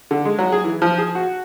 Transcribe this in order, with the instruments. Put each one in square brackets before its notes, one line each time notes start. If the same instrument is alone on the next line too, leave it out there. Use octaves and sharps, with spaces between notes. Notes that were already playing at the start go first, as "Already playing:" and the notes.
[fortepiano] D3
G#3
F#3
G#4
E3
F3
G#4
F#4